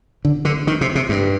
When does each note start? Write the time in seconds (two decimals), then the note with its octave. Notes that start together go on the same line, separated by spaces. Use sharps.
0.25 D3
0.45 D3
0.67 D#3
0.81 C3
0.95 C3
1.09 G2